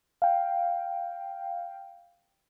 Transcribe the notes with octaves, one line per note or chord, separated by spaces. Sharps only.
F5 G5